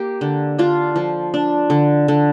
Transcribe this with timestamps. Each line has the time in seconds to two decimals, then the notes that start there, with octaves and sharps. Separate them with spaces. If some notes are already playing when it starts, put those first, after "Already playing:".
Already playing: A#3 G4
0.21 D3
0.59 D4 F4
0.96 F3
1.34 D4
1.70 D3
2.08 D3